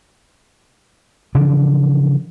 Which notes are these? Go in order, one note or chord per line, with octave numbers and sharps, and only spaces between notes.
C#3 E3 F3 D4